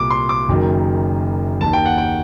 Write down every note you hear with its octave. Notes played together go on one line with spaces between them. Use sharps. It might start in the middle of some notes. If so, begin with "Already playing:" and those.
Already playing: C2 A#2 D6
C6
D6
F#1 F#2 D#3
D#2 D#3 A5
G5
F#5
G5